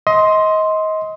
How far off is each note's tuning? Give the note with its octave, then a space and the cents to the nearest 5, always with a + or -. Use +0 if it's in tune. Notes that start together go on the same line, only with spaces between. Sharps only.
D#5 +25 C6 +0